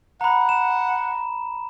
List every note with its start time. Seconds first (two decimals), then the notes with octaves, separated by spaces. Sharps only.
0.21 F#5 A#5 B5
0.49 E7